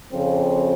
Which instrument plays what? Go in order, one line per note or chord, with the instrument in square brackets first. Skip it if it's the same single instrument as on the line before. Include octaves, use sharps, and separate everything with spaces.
[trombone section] F2 C#3 F3 C4